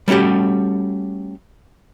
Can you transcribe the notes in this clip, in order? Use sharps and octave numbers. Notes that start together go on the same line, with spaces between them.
G3 A3 C#4 F#4 G4